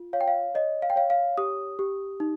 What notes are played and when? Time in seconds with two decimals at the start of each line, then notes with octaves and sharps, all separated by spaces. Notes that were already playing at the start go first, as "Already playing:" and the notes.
Already playing: F4
0.13 C#5 F5
0.21 G5
0.28 F5
0.55 C#5 D#5
0.82 F5
0.90 G5
0.96 C#5 F5
1.10 F5
1.38 G4 D#6
1.79 G4
2.20 D#4